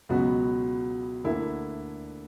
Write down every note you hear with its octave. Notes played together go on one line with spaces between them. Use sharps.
C#2 B2 F#3 B3 F#4
D2 D3 A#3 E4